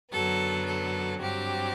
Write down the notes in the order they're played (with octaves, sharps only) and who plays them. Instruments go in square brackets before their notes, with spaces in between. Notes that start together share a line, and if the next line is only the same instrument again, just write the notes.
[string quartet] F#2 D3 F#3 B3 A4
A4
G2 F#3 C4 G4